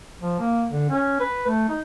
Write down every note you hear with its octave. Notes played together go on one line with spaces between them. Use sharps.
F3
A#3
D3
C#4
B4
A3
D#4